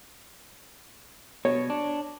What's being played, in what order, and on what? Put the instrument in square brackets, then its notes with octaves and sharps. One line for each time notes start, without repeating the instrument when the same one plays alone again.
[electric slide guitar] B2 [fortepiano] C#5
[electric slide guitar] D4